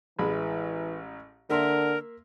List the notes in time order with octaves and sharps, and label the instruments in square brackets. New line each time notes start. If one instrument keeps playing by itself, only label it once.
[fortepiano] A1 G#3 B5 [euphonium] E3
[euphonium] D3 [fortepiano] A#3 E5 C6 [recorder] A#4